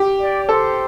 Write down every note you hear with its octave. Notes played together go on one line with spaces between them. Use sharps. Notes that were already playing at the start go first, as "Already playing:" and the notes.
Already playing: G4
D5
A4 C5